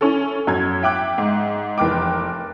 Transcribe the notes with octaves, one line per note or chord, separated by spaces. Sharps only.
C#4 E4 A4
F#2 G#6
E5 G5 D6 F#6
G#2
F1 E3 A#4 G5 D6